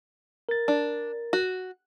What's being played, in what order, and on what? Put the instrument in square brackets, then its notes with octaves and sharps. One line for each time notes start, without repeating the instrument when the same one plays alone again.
[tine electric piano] A#4 A6
[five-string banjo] D4
F#4